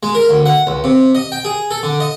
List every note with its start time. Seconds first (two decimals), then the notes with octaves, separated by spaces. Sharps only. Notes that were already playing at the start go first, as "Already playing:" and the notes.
0.03 G#3
0.15 A#4
0.29 D2
0.46 F#5
0.67 C#2
0.84 C3
1.15 D#5
1.32 G5
1.45 G#4
1.71 A4
1.83 D3
2.00 D#5